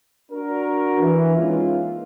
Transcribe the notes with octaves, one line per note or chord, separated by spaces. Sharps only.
D4 F#4 A#4
E3
G#3 A#3 C#4 D#4 F4